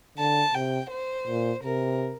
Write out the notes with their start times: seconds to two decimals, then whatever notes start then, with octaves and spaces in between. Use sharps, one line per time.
0.18 D3 A5
0.54 C3 G5
0.90 C5
1.27 A#2
1.63 C3 A#4